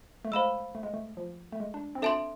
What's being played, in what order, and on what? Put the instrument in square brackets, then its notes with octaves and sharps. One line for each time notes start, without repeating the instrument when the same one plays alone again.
[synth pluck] A3
[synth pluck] G#3 [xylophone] C5 F5 B5 E6
[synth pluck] A3
G#3
A3
F3
A3
G#3
D4
C4
[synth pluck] D4 [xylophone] A4 E5 A5 C6